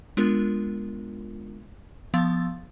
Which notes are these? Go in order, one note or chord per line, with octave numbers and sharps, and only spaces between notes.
G#3 B3 D4 F4 A#4
F3 B3 F5 C6 E6 A6